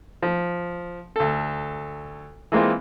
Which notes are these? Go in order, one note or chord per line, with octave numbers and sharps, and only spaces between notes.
F3
D2 A4
E3 G#3 A#3 C4 F4